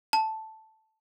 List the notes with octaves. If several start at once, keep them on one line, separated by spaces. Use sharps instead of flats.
A5